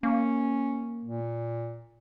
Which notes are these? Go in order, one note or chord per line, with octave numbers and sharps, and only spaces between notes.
A#3 C#4
A#2